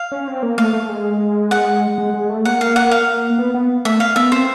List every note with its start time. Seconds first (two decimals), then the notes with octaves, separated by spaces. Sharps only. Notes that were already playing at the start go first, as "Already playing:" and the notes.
Already playing: F5
0.12 C#4
0.28 C4
0.43 A#3
0.58 A3 F5
0.73 A3
0.89 G#3
1.51 F#5
1.98 G#3
2.14 G#3
2.29 A3
2.45 A#3 F#5
2.61 F5
2.76 F#5
2.91 F5
3.38 B3
3.54 B3
3.85 A3 E5
4.00 F5
4.16 B3 E5
4.32 C4 C5